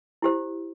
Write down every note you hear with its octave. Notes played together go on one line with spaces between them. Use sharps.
E4 G4 C5